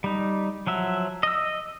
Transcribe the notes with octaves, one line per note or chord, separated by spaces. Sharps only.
G3 D#4
F3 F#3 E5
D#5 E6